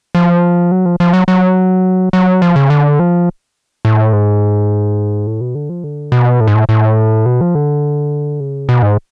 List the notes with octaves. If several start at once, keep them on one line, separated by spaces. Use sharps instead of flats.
F3
F#3
F3
F3
F#3
F#3
F#3
F3
C#3
D3
F3
A2
G#2
A2
B2
D3
F3
D3
B2
A2
G#2
A2
A2
B2
F3
D3
C#3
B2
G#2